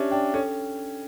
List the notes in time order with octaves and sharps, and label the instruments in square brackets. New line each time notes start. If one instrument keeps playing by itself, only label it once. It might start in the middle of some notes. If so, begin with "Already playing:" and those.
Already playing: [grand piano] C#4 D4 [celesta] G4 E5
[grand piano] D4 [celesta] G5
[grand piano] C#4 [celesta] A4